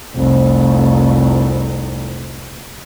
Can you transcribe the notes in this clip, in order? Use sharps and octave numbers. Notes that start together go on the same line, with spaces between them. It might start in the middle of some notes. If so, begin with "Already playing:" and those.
F1 C2